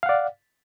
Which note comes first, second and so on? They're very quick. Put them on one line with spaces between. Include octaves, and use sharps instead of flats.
F5 F#5 D5